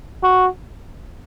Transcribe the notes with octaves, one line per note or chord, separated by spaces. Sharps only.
F#4